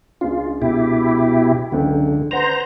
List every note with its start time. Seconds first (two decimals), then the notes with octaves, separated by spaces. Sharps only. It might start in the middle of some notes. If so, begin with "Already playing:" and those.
0.21 C#2 G#3 D4 F4
0.62 B2 E4 G4
1.72 C#2 F#2 D3 G5
2.31 B4 C5 D5 F#5 A#5